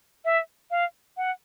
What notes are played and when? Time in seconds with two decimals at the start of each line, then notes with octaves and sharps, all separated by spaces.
0.25 E5
0.71 F5
1.17 F#5